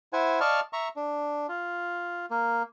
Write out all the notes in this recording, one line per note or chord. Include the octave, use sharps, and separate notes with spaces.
E4 C5 F#5 G#5
D5 D#5 F5 A5 C#6 F6
E5 A#5 C#6
D4
F4
A#3